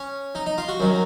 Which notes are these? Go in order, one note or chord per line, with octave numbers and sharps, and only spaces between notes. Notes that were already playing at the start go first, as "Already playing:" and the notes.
Already playing: C#4
D#4
D#4
F4
F#4
F#2 D#3 F#3